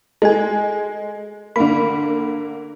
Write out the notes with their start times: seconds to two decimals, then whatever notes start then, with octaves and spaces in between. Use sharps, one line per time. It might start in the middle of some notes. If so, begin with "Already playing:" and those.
0.22 G#3 A4 G#5
1.56 D3 A#3 B5